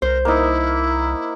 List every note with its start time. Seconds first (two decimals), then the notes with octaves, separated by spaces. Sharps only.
0.02 C2 A#4 C5
0.25 A#3 D#4 E4